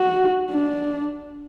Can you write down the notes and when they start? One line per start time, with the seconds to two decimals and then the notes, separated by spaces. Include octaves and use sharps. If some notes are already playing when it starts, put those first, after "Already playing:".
Already playing: F#4
0.51 D4